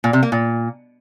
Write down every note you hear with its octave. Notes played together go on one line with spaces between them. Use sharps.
A#2
C3
A#3
A#2